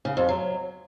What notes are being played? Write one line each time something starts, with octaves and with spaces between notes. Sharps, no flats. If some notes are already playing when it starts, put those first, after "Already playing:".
C#3
F2
F#3